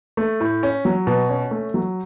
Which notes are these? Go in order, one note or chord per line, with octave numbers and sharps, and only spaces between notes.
A3
A2
C#4
F#3
B2
C#4
A3
F#3